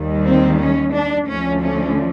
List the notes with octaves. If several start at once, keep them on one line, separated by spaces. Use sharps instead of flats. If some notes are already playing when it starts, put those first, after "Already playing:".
Already playing: D#2 D#3 G3
C4
C#4
D4
D2 D3 F3 A3 C#4
C#4